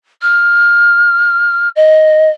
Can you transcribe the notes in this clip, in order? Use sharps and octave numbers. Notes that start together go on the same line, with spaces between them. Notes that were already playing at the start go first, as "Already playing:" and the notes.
F6
D#5